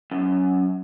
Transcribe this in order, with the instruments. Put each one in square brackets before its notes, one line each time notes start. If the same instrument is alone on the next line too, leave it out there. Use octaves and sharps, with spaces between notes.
[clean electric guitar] F#2